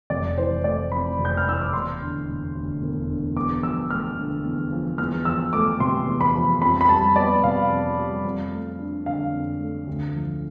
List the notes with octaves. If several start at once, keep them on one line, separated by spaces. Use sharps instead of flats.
F1 D5
E3 C5
A3 D5
F2 B5
F1
G6
F6
E3 E6
D6
E1 C6
D3
E1
D2
E1
D3
E2 D6
F3 E6
A3 F6
D3
E2
F3
E2 F6
F3 E6
A3 D6
C3 C6
E2
B5
F3
F2 B5
B5
G3 A5
B3 D5
C3 F5
F2
G3
F2
A3
D4
D3 F5
F2
A3
D2
F3